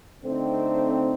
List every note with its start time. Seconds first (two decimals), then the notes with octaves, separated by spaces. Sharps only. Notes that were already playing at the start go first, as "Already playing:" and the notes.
0.23 D3 A3 C4 D#4